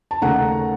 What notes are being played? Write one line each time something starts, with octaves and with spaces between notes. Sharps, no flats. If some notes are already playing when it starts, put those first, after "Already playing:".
A5
D#2 C#3 A3 D#4 F#5 A#5